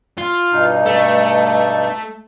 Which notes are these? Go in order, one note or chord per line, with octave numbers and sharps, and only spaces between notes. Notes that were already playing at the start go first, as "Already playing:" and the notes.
F4
G2 B2 D#4
A3